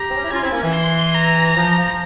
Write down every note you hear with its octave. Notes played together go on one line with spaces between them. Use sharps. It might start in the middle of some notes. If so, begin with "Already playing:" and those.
Already playing: G4 A#5
C4
C#4
E4
C#4 F4 G#5
C4 E4
A#3 C#4
E3
C6
A#5
F3
F3